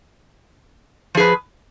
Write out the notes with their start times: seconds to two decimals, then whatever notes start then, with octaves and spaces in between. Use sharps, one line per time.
1.15 F3
1.17 G#4
1.20 B4